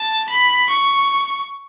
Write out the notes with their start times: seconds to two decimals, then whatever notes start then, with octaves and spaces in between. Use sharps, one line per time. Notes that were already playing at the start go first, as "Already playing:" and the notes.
Already playing: A5
0.30 B5
0.69 C#6